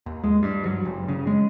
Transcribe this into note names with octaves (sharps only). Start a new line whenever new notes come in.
D#2
G#3
G2
F#3
F#1
C#3
G#3